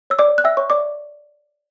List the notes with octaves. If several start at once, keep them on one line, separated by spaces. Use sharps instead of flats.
C#5 E6
D5 D6
C#5
F#6
E5 G5 E6
C#5 E5 C#6
D5 D6
E5